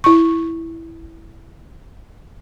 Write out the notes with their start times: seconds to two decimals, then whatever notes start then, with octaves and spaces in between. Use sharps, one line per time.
0.04 E4 C#6